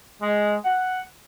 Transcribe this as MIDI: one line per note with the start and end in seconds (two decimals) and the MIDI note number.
0.22 0.56 56
0.64 1.02 78